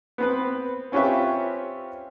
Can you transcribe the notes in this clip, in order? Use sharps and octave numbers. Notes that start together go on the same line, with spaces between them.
B3 C4 B4
C4 C#4 F4 G4 B4 E5